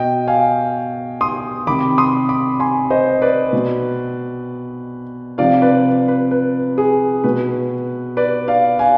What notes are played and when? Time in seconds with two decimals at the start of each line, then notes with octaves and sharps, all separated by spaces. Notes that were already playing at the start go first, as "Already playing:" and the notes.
Already playing: B2 D#5 G5
0.27 F5 G#5
1.21 C6 D#6
1.67 C3 D#3 B5 D6
1.98 C6 D#6
2.29 B5 D6
2.60 G#5 C6
2.90 C5 D#5
3.22 B4 D5
3.53 B2
5.38 C3 F3 D5 F5
5.62 B4 D5
6.08 B4
6.31 B4
6.78 G#4
7.24 B2 B4
8.17 B4 D5
8.48 D5 F5
8.79 F5 G#5